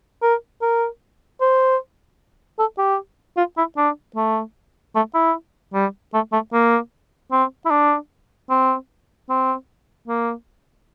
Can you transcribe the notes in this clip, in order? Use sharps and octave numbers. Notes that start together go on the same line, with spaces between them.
A#4
A#4
C5
A4
G4
F4
E4
D4
A3
A3
E4
G3
A3
A3
A#3
C4
E4
D4
C4
C4
A#3